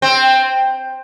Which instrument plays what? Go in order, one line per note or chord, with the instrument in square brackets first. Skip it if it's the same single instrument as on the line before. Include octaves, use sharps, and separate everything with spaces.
[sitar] C4